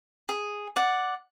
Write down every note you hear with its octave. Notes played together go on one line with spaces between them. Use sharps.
G#4
D5 F#5